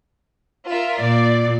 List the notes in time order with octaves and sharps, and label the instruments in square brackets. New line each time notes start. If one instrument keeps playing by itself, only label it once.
[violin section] F4 A#4 E5
[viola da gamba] A#2 [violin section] D5